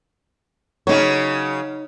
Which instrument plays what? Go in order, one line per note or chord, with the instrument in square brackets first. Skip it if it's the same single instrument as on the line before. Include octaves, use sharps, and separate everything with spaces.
[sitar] C#3 F#3 [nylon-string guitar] D#4 C#5